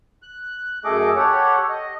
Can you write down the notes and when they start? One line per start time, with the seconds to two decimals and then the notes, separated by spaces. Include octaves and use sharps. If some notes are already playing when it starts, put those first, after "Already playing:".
0.23 F#6
0.85 F#2 A3 G#4 A4 D#5 D6
1.16 G4 A4 C#5 F#5
1.70 D#5